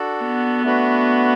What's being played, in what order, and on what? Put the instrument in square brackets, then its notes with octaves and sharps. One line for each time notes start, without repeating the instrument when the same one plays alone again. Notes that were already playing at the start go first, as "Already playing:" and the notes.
Already playing: [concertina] D4 F#4 A4
[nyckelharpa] B3
[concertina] A3 D4 F#4 B4